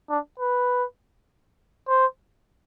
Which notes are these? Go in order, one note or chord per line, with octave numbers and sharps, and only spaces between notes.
D4
B4
C5